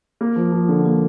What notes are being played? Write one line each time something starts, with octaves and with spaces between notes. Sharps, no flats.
A#3
F3
F3
D3
A#3